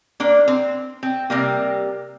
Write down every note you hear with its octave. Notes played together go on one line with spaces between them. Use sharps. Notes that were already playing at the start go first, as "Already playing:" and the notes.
A#3 D4
C4
C4
C3 G3 A#3